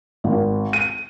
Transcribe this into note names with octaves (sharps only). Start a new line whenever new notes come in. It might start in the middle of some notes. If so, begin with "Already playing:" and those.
G#1
D#7